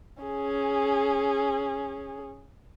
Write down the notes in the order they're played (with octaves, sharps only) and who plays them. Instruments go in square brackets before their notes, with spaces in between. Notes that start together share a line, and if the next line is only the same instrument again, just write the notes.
[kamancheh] C#4 G#4